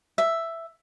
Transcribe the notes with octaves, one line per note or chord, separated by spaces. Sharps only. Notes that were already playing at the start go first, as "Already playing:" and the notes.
E5